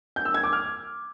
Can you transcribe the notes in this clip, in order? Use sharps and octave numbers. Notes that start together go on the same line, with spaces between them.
G6
E6
G#6
D6
F6